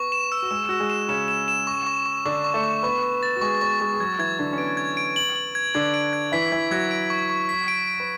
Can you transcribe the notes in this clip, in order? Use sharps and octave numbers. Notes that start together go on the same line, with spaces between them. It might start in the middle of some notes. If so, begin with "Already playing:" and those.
Already playing: B3 C#6
E7
E6
F#4
G#3 G#4 E6
F#4 E6
G#3 G#4
E7
C#3 C#4 E7
E7
E7
C#6
C#6
C#6
D3 D4 C#6
C#6
A3 A4
C#6
B3 B4 C#6
C#6
A6
F#4
G#3 G#4 C#6
B3 B4 C#6
G#3 G#4 C#6
G#4
F#3 F#4 G#6
E3 E4 G#6
D3 D4 G#6
C#4
B3 D7
G#6
D7
F#7
F#7
G#6
D3 D4 G#6
D7
G#6
E3 E4 B6
E3 E4 G#6
F#3 F#4 G#6
D7
C#6
C#6
B6
D7
D7
B4